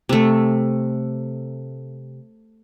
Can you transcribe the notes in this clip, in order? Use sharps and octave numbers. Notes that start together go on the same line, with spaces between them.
C3 A3